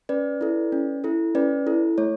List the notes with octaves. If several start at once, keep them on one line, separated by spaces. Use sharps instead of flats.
C#4 B4 D5
E4 A4
C#4
E4 A4
C#4 B4 D5
E4 A4
A3 C#5